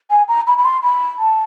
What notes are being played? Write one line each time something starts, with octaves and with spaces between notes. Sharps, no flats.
G#5
A#5
B5
B5
C6
B5
A5